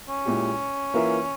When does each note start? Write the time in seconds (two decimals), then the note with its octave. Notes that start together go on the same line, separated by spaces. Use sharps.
0.09 C#4
0.25 A#2 G#3 E4 G4
0.94 E3 A#3 F4 A#4 E5